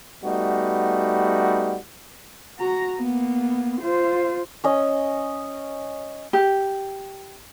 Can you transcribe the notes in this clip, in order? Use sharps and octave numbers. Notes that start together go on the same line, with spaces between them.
G3 A3 B3 D#4 F#4
F#4 A#5
A#3 B3
F4 C5
C#4 D#5
G4